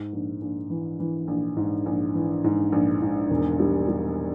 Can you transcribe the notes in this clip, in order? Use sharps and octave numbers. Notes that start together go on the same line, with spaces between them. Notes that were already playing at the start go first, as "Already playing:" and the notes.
Already playing: G#2
A#1
A#1
E3
E3
A#1
G#2
A#1
E3
G#2
A#1
G#2
E1
G3
G3